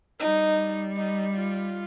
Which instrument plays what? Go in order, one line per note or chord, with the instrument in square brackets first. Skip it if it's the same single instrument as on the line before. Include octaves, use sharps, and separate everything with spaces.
[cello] G3 [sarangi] D#4
[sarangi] D#4
F4